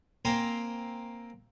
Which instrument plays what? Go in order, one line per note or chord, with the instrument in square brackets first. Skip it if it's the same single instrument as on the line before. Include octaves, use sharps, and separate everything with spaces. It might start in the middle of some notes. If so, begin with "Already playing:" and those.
[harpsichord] A#3 C4 G#5 A#5 C6